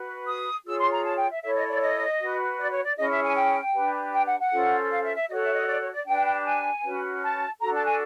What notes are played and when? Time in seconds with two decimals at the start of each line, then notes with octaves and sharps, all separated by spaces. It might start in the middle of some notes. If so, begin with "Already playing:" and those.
Already playing: F#4 B4
0.26 D#6
0.65 F4 G#4 C#5 E6
0.78 C6
0.91 A#5
1.04 A5
1.16 G5
1.30 E5
1.42 E4 A4 C#5 E5
1.55 D#5
1.68 D5
1.80 D#5
2.19 F#4 B4
2.58 D5
2.70 C#5
2.83 D5
2.97 C#4 E4 G#4 D#5
3.10 E5
3.23 G#5
3.35 G5
3.74 D4 G4 B4
4.13 G5
4.26 F#5
4.39 F#5
4.51 C#4 F4 A4 C5
4.89 F5
5.03 E5
5.15 E5
5.28 F#4 A4 C#5 D#5
5.42 E5
5.54 D#5
5.67 D5
5.80 C#5
5.92 D5
6.06 D4 G4 B4 G5
6.44 G#5
6.83 C#4 F#4 B4
7.21 A5
7.61 D4 F#4 A4 A#5
7.74 A5
7.86 G#5